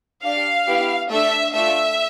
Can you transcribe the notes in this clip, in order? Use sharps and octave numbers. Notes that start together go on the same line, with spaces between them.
D4 G4 F5
B3 E4 G4
A3 D4 A4 E5
A3 D4 F4 E5